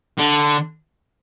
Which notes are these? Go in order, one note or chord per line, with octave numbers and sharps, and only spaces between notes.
D3